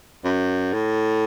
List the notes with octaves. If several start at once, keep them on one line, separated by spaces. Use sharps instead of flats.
F#2
A2